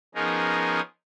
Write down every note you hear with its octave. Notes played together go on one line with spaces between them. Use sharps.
F3 B3 C#4 D#4 G#4 A#4